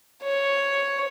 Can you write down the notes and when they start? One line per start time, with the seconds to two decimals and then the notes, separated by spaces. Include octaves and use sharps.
0.23 C#5